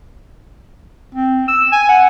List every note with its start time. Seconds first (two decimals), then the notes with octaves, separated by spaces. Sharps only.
1.15 C4
1.48 E6
1.72 G#5
1.89 F#5